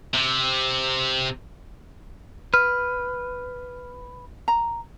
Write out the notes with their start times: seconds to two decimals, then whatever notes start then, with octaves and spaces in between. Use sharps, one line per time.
0.14 C3
2.54 B4 F6
4.48 A#5